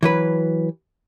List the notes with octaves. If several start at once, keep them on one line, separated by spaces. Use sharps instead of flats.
E3 F#3 B4